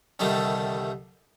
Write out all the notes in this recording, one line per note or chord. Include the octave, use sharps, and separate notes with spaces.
C2 D3 D#3 G3 A3